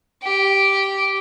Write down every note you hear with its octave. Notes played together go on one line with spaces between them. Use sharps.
G4